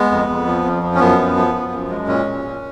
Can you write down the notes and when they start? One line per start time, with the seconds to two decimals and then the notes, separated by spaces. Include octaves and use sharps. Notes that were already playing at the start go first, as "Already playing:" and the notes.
Already playing: G#3 B3
0.11 F2
0.29 F2
0.46 F3
0.65 F2
0.83 F3
0.95 C#4
1.00 F#2 B3
1.18 F3
1.36 F3
1.55 F3
1.72 F#2
1.90 G#3
2.07 A#2 C#4
2.26 A#2
2.45 A#2